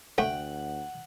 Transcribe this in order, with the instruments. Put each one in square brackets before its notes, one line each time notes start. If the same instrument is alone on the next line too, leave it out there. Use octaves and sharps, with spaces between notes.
[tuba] D2 [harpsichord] A3 [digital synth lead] F#5 [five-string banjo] G5